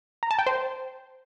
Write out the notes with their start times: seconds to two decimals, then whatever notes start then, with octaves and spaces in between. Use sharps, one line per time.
0.23 A#5
0.31 A5
0.39 G5
0.47 C5